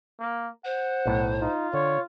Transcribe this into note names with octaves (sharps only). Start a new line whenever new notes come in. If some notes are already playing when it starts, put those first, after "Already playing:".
A#3
C5 F#5
B1 A2
D#4 F4
D3 C#5